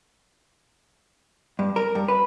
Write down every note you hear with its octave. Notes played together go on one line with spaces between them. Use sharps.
G2
A#4
G2
B4